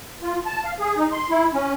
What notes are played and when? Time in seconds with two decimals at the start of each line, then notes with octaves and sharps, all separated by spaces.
0.22 F4
0.46 A5
0.64 F5
0.80 G#4
0.96 D#4
1.12 C6
1.30 E4
1.54 C#4